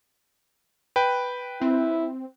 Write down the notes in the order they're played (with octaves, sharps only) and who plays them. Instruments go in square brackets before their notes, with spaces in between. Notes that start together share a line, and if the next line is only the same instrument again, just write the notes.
[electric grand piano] B4 G5
[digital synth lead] C4 [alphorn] E4